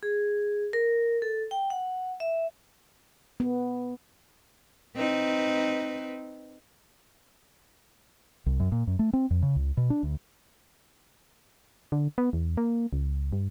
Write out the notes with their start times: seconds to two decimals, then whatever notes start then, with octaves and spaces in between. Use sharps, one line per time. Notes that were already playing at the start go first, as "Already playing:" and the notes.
0.03 G#4
0.73 A#4
1.22 A4
1.51 G5
1.70 F#5
2.20 E5
3.40 B3
4.96 C4 D#4 B4
8.46 C2
8.60 F#2
8.72 A#2
8.87 F#2
8.99 A3
9.13 C4
9.30 F2
9.42 C#3
9.56 C#2
9.77 B2
9.90 D4
10.03 D2
11.92 D3
12.18 B3
12.33 E2
12.57 A#3
12.93 C#2
13.32 G2